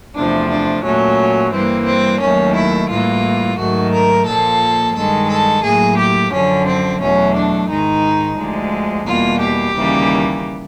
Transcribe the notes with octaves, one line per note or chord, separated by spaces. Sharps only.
E2 C3 F3 A3 D4
D4
A#2 F#3 A3 C#4
G2 E3 G3 A#3 C4
C4
D#2 D#3 F#3 A3 C#4
E4
A2 E3 G3 A#3 F4
G#2 D#3 F#3 A3 F#4
A#4
A#2 F3 A#3 A4
G2 D#3 G#3 A4
A4
A2 F#3 A#3 G#4
G4
F#2 D3 F3 C#4
C4
E2 B2 F#3 A3 C#4
D4
G#2 D#3 G#3 D#4
D2 D3 F3 G#3
E2 B2 G3 A#3 F4
G4
D#2 C#3 E3 G3 A#3